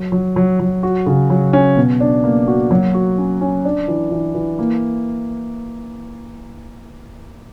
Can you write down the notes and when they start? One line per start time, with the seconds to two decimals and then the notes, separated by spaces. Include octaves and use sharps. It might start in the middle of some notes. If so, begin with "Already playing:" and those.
Already playing: F#3
0.12 F#3
0.36 F#3
0.60 F#3
0.83 F#4
1.06 C#3
1.30 F#3
1.53 C#4
1.77 B2
2.00 D4
2.24 A#3
2.47 F#4
2.71 F#3
2.94 F#4
3.18 C#4
3.41 C#4
3.65 D4
3.88 E3
4.11 E3
4.34 E3
4.59 A#3